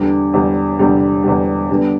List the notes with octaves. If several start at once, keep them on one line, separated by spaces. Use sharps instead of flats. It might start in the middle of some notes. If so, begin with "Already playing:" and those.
Already playing: E2 D3 G3
E2 D3 G3
E2 D3 G3
E2 D3 G3
D3 G3 B3